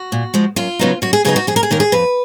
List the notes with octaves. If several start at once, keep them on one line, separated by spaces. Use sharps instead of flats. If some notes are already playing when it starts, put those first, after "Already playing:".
Already playing: F#4
A#2
F3 G#3
F#2 F4
C#3 F#3 B3 D#4
F#2 F#4
G#4
C#3 F#3 B3 D#4 G#4
F#4
F2 G#4
A#4
G#4
D#3 A#3 C#4 A#4
G#4
F2 B4